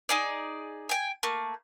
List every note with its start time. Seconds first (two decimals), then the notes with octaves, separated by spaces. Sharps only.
0.09 D#4 G#4 D5
0.89 G5 G#5
1.23 A3 A#3